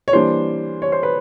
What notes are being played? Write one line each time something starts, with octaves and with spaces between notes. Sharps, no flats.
C#5
E3 G3 A#3 D4 C5
C#5
C5
B4